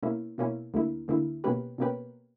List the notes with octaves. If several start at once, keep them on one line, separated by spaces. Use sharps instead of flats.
B2 A#3 C#4 E4
B2 A#3 C#4 E4
D2 D3 A#3 E4
D2 D3 A#3 E4
B2 A#3 C#4 G4 B4
B2 A#3 C#4 G4 B4